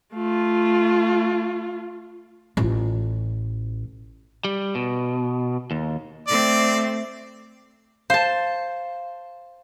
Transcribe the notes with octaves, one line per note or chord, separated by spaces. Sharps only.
A3 F4
A1 F4
G3
B2
D#2
A3 C4 D5
C5 F5 A5